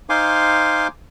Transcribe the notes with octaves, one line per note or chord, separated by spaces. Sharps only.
D#4 C5 F5 G#5 C6 D6